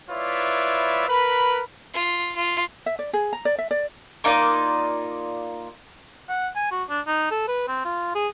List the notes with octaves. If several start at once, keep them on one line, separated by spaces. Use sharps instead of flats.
E4 F4 B4 C#5 D5 E5
A#4 B4 B5
F4
F4
E5
D5
G#4
A#5
D5
E5
D5
A#3 D#4 F4 D5
F#5
G#5
F#4
D4
D#4
A4
B4
C4
F4
G#4